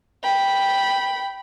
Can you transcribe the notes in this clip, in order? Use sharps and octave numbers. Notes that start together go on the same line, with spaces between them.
G5 B5